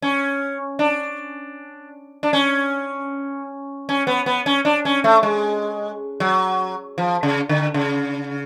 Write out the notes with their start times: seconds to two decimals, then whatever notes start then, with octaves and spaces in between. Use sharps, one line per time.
0.02 C#4
0.79 D4
2.23 D4
2.33 C#4
3.89 C#4
4.07 B3
4.26 B3
4.46 C#4
4.65 D4
4.85 C#4
5.04 A3
5.23 G#3
6.20 F#3
6.98 F3
7.23 C#3
7.49 D3
7.74 C#3